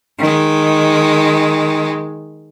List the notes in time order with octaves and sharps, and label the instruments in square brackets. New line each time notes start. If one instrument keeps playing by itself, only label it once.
[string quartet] D#3 G#3